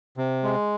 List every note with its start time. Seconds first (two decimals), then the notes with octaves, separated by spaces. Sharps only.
0.17 C3
0.43 G#3